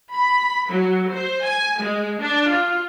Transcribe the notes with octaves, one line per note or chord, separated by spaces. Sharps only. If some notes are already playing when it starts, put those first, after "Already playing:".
B5
F#3
C5
G#5
G#3
D4
F4